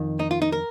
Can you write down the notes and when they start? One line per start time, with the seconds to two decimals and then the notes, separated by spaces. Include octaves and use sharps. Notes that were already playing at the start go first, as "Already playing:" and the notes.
Already playing: F2 D#3
0.20 D#4
0.31 F4
0.42 D#4
0.52 A#4